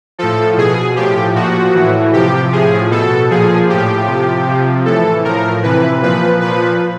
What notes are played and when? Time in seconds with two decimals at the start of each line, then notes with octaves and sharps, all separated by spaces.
0.19 A2 F3 A4
0.57 B2 G#4
0.96 A2 F3 G4
1.35 A#2 F3 F#4
1.74 A2 E3
2.13 C3 F3 G4
2.52 A2 F3 G#4
2.91 B2 A4
3.31 A#2 F3 G#4
3.69 A2 F3 G4
4.07 C3 F3
4.46 C3 F3
4.85 A2 E3 A4
5.25 A2 F3 A#4
5.63 C3 E3 B4
6.02 A#2 F3 B4
6.41 A#2 F3 B4